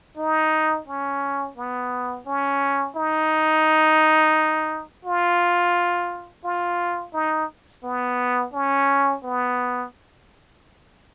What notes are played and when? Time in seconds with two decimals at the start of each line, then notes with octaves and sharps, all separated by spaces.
0.17 D#4
0.87 C#4
1.57 B3
2.26 C#4
2.96 D#4
5.05 F4
6.44 F4
7.14 D#4
7.84 B3
8.53 C#4
9.23 B3